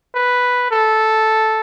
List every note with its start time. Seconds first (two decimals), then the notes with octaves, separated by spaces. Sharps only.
0.15 B4
0.71 A4